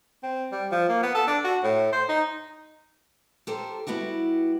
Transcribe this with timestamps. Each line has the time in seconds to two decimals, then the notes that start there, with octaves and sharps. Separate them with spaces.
0.23 C4
0.52 G3
0.71 F3
0.89 A#3
1.03 B3
1.15 A4
1.27 D4
1.44 F#4
1.63 A2
1.93 C5
2.09 D#4
3.47 G4 A4 A#4 C5
3.87 G3 B3 E4 F#4 G4